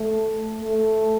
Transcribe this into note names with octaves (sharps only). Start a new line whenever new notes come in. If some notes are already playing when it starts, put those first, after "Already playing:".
Already playing: A3
A3